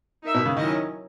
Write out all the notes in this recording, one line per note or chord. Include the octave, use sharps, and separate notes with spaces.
D#4 A#4 E5
B2
C#3
D#3 F#3 C#4 E4 A#4 D#5